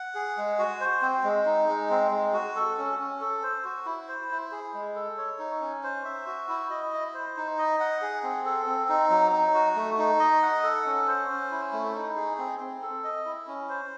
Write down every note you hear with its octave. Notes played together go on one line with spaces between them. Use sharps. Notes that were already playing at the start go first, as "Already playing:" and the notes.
Already playing: F#5
G#4
G#3
F#4
C5
C4
G#3
D#4
G#3
C4
G#3
F#4
A4
C#4
C#4
A4
C5
F#4
E4
C5
E4
G#4
G#3
A4
C#5
D#4
C#4
C5
E5
F#4
E4
D#5
E4
C5
D#4
D#5
F#5
G#4
C4
A4
C4
D#4
F#3
D#4
F#4
A3
D#4
D#5
F#5
A4
C#4
C5
C#4
E4
A3
D#4
G#4
C4
C4
A4
D#5
E4
C#4
C5